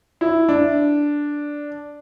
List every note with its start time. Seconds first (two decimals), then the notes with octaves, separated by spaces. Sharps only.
0.21 E4
0.49 D4